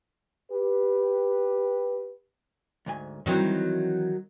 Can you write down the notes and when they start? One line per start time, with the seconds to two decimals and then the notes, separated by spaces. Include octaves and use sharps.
0.51 G4 B4
2.86 D2 G#2 G#5
3.26 D#3 E3 F#3 C4 E4